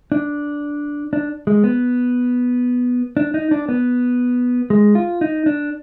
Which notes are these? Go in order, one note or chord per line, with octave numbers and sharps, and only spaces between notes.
D4
D4
G#3
B3
D4
D#4
D4
B3
G#3
F4
D#4
D4